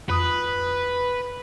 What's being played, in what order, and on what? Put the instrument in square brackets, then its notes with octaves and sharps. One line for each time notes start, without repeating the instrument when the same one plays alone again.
[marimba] F2 D#6 [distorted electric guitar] B4